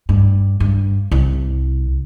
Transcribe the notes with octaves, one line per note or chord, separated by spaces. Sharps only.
G2
G2
C2